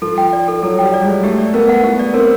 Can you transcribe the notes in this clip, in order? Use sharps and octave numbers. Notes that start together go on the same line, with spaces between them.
F3 A4
G5
D5
A4
F#3 A4
G3 G5
D5
G#3
A4
A3 G4
D5
B3 A#4
F#5
B3 G4
D5
C4 A#4